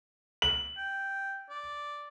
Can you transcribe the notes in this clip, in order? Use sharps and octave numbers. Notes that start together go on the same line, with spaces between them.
F#7
G5
D5